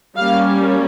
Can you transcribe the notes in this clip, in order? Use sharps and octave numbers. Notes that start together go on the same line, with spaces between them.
G3 A#3 C#4 F5